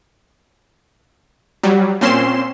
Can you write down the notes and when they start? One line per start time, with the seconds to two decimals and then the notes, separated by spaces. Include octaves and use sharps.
1.63 F#3 G3
2.01 A#2 C4 C#4 C6 C7 E7